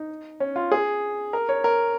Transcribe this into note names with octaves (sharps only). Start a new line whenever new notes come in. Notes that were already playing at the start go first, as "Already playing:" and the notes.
Already playing: D#4
C#4
F4
G#4
A#4
C#5
A#4